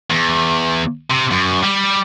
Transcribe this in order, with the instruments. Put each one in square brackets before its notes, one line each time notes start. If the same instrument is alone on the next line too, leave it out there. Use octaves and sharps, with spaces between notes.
[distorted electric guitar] E2
C3
F#2
G3